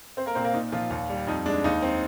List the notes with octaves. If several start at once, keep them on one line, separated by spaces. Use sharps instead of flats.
C4 C5
A#3 A#4
A#2 C4 C5
A#3 A#4
A#2 D#4
A#2 F3 F4
D#2
G3
F2 D#4
G#3 D4
D#2 D#4
C4